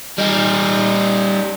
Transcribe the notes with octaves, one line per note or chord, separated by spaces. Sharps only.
G3 D#4